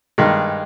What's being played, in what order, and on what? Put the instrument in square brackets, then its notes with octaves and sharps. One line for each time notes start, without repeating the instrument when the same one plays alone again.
[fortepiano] G2 D#3 G#3